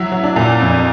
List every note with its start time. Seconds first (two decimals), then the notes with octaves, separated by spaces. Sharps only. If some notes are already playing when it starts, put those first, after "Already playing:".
Already playing: F#3 E4
0.12 F#3
0.24 D4
0.36 A#2
0.60 F2